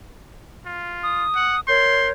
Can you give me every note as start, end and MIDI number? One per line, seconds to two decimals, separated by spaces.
0.66 1.25 65
1.04 1.60 87
1.35 1.56 78
1.68 2.11 70
1.68 2.11 73
1.68 2.09 84
1.68 2.11 91